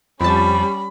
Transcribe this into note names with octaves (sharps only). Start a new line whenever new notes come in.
F2 F3 G3 C#4 A5 B5